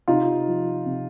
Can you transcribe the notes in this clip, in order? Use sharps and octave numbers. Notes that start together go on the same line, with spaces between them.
C3 D#4 F4
F3
C3